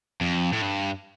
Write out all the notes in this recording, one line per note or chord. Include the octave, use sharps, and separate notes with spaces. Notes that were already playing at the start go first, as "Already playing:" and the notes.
F2
A2
G2